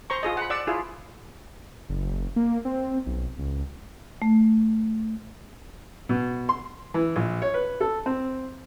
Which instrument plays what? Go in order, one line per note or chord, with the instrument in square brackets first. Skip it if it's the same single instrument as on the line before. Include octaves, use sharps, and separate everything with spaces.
[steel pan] C5 A#5 C#6
F4 G#4 D#5
F#5 B5
D5 F#5 E6
E4 F4 G#4
[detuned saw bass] F#1
A#3
C4
B1
C#2
[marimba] A3
[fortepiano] B2
C6
E3
A#1
C#5
B4
A4
C4